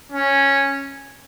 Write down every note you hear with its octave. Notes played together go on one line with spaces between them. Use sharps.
C#4